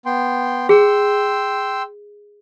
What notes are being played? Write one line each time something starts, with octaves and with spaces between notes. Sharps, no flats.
B3 G5 C6
G#4 G5 C6 E6